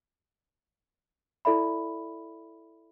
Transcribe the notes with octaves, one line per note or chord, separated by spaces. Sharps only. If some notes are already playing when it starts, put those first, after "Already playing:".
E4 A4 D5 E5 B5